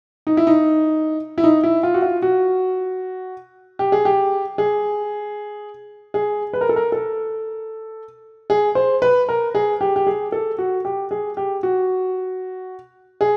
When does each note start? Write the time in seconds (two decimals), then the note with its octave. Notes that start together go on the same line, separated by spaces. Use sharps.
0.27 D#4
0.37 E4
0.47 D#4
1.38 E4
1.44 D#4
1.63 E4
1.83 F4
1.94 F#4
2.02 F4
2.22 F#4
3.79 G4
3.92 G#4
4.05 G4
4.58 G#4
6.14 G#4
6.53 B4
6.61 A#4
6.69 A4
6.76 A#4
6.92 A4
8.50 G#4
8.75 C5
9.02 B4
9.29 A#4
9.55 G#4
9.81 G4
9.96 G4
10.07 G#4
10.32 A4
10.58 F#4
10.85 G4
11.11 G#4
11.37 G4
11.63 F#4
13.21 G#4